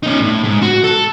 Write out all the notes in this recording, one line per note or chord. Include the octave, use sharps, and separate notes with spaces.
C#4 D#4
A2
G#2
F#4
A4